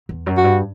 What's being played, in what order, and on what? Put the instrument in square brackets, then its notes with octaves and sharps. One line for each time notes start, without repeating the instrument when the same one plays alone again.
[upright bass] E2
F#2
[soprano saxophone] F#4
[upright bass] G2